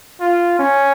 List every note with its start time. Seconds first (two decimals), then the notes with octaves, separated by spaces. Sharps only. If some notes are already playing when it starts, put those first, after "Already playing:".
0.21 F4
0.59 C#4